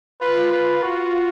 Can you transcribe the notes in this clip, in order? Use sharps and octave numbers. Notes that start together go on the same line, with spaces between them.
F4 B4
B4
F#4